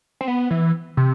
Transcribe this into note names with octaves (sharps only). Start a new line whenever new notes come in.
C4
B3
E3
C3